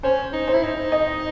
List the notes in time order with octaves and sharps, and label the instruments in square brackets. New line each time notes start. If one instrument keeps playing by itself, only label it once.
[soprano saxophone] C#4 [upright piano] C5
[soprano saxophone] D#4
[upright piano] C5
[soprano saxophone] E4
D#4
[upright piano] D#5